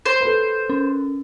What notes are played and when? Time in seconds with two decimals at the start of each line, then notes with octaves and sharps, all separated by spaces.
0.06 C5
0.21 A4 B4
0.70 C#4